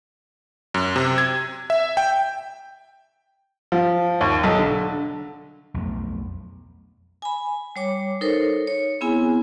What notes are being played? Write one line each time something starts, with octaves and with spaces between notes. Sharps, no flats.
F#2
C3
G#6
E5
G5
F3
D#2
B1
D3
B1 F2 A3
G#5 B5
G3 C#5 D6
D#4 A4 A#4 C5 C#5
C#5
B3 C4 E4 G#4 G#5